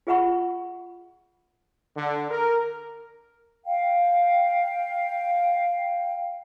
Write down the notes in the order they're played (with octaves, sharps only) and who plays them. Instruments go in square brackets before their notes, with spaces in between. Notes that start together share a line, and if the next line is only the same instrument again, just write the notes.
[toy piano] F4 G#4 E5 F#5 B5 C#6
[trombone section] D3
A#4
[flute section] F5 G5